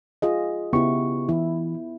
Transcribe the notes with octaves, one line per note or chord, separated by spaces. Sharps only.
F4 G#4 D#5
C#3 B3 E4 G4 C#6
E3 E4